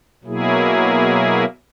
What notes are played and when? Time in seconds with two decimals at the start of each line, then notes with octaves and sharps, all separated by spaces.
0.24 B2 F#3 A#3 E4 G#4